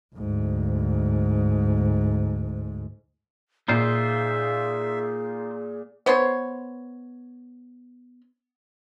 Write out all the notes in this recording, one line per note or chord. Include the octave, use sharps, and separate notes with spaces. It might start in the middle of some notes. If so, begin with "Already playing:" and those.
D2 G#2
A#2 D#4 F4 G#4 C5 E5
B3 C5 C#5 C6